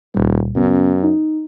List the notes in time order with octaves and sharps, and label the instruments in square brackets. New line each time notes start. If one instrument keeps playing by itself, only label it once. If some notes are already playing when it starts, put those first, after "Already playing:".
[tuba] D#1 [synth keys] C#2 A#2 G3
[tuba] F#2 [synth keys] C#3 B3 C#4
[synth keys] D#4